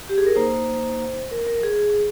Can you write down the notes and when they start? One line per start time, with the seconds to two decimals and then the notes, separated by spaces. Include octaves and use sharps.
0.09 G4
0.18 G#4
0.27 A#4
0.36 A#3 D#4 C5
1.31 A#4
1.47 A#4
1.63 G#4
1.79 G#4